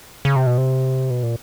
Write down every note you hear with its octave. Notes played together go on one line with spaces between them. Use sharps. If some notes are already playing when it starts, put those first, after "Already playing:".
C#3
C3
B2
C3
B2
A#2